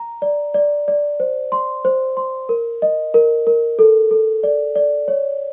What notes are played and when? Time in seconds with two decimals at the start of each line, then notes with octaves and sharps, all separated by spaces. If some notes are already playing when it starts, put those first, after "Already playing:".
Already playing: A#5
0.22 D5
0.54 D5
0.88 D5
1.20 C5
1.52 C6
1.85 C5
2.17 C6
2.49 A#4
2.82 D#5
3.14 A#4
3.47 A#4
3.79 A4
4.11 A4
4.43 D5
4.76 D5
5.08 C#5